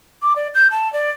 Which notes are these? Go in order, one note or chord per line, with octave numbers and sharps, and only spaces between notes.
D6
D5
G6
A5
D5